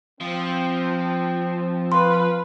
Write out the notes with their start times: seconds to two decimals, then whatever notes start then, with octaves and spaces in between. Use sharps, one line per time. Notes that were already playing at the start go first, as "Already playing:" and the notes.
0.20 F3 C4
1.92 B4 F5 C6